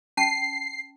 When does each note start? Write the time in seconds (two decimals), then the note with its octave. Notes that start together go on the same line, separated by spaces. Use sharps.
0.17 C#4 G5 A5 C7